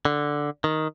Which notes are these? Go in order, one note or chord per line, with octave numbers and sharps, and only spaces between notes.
D3
D#3